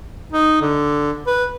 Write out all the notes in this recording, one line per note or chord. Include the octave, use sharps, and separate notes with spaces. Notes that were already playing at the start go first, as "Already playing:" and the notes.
D#4
D3
B4